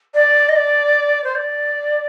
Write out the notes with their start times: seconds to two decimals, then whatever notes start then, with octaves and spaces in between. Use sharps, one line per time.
0.14 D5
0.49 D#5
0.55 D5
1.24 C5
1.35 D5